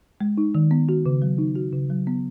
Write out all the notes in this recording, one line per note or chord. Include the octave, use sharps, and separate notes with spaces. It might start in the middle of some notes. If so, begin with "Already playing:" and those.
G#3
D#4
D#3
B3
F#4
C#3
F#3
D#4
F#4
C#3
F#3
B3